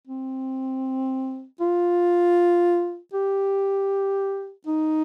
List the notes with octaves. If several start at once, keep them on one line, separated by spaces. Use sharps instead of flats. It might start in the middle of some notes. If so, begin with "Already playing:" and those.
C4
F4
G4
D#4